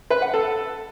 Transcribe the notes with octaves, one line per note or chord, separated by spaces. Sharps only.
B4
F#5
A4